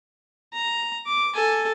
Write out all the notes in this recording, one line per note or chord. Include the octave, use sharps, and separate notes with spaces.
A#5
D6
A4 G#5